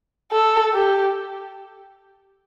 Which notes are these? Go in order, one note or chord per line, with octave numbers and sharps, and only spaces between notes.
A4
G4